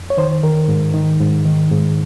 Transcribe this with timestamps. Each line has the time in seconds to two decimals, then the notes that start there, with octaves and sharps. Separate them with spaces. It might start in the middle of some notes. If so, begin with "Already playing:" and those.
Already playing: F2
0.10 C#5
0.17 D#3 C5
0.43 D#3 A#4
0.68 G#2
0.94 D#3
1.20 G#2
1.45 D#3
1.71 G#2